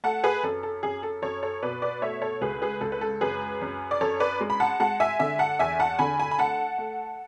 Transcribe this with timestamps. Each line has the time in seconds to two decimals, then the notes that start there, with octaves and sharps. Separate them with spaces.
0.04 A3 F#5 A5
0.24 G#4 B4
0.43 F#2 A4
0.63 A4
0.83 F#2 G#4
1.03 A4
1.22 F#2 A4 C#5
1.43 A4 C#5
1.63 B2 B4 D5
1.82 B4 D5
2.02 A3 C#5 E5
2.22 A4 C#5
2.41 C#2 G#4 B4
2.62 G#4 B4
2.81 C#2 A4
2.92 B4
3.01 A4
3.21 F#2 G#4 B4
3.61 F#2
3.91 D5
4.01 F#2 A4 C#5
4.20 B4 D5
4.41 G#3
4.50 B5
4.60 F#5 A5
4.80 G#3 F#5 A5
5.00 E5 G#5
5.19 D3 E5 G#5
5.39 F#5 A5
5.59 E2 E5 G#5
5.79 F#5 A5
5.99 D3 G#5 B5
6.19 G#5 B5
6.31 B5
6.39 A3 F#5 A5
6.78 A3